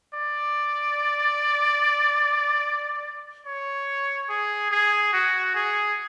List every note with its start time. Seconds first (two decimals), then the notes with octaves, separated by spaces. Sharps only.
0.14 D5
3.46 C#5
4.29 G#4
4.71 G#4
5.13 F#4
5.55 G#4